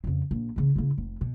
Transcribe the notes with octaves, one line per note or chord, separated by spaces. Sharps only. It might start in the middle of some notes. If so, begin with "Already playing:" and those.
F2 C#3
A#1
C#3 E3
C#3 E4
F1
B2